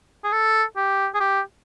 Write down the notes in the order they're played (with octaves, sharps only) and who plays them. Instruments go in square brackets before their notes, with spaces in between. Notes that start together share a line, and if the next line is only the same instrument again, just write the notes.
[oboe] G#4
A4
G4
G#4
G4